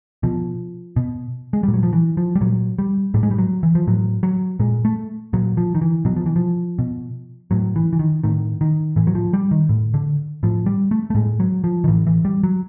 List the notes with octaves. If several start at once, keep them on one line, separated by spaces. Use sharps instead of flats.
B2 F3
B2
G#3
A#2 G3
F#3
F3
E3
F3
G3
A#2 F#3
G3
A2 G3
G#3
G3
F#3
E3
F3
A2 F#3
F#3
A#2 G#3
A3
A#2 F#3
F3
D#3
E3
B2 F#3
F3
E3
F3
B2
A2 F#3
E3
E3
D#3
A2 D#3
D#3
A2 E3
F#3
F3
G3
D#3
A2
D3
A2 F3
G3
A3
A3
A2 G#3
F#3
F3
D#3
A2 E3
E3
G3
F#3